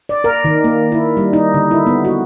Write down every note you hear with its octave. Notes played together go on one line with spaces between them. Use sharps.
D5
A#4
D#3
A#3
E4
G3
D#4
D3
E4
B3
F#4